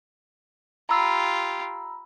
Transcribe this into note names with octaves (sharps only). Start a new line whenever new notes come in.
F4 G4 A#5 B5 E6